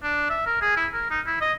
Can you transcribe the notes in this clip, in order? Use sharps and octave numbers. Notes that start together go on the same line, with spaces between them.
D4
E5
A#4
G#4
E4
A#4
D#4
E4
D#5